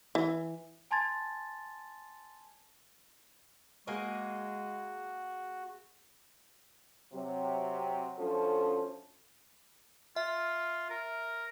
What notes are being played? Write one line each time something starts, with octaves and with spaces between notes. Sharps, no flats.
E3
G#5 A5 C6 G#6 A6
G#3 A#3 F#4 G#4 D#5
C3 F#3
D2 F3 C#4 A4
F4 E5
A#4